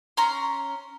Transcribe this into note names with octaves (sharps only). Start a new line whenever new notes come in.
C#4 A#5 C6